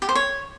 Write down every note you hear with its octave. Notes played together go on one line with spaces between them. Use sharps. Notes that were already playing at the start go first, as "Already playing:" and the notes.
G4
C5
C#5